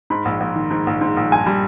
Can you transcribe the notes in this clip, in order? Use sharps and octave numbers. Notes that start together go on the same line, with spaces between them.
G#2 B5
A#1
A#1
D#3
G#2
A#1
G#2
A#1
G2 G#5
G3